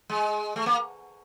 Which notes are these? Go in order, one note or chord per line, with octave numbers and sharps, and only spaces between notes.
G#3
A3
A#3